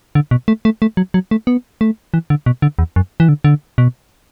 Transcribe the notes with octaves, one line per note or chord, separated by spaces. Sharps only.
D3
B2
A3
A3
A3
F#3
F#3
A3
B3
A3
E3
D3
B2
D3
E2
F#2
E3
D3
D3
B2